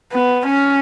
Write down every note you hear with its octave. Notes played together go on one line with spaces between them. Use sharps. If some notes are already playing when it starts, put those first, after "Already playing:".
B3
C#4